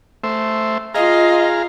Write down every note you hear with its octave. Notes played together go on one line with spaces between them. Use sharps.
A3 C5 E5
F4 G#4 D#5 F5 A#5 F6